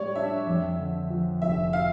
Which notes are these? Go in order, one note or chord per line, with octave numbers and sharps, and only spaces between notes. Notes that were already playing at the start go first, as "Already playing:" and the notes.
Already playing: A2 G3 C#5 D5
D4 E5
F2
D3
F3
F1 E5
F5